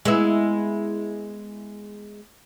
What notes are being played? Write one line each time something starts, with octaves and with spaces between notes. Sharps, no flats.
G#3 B3 E4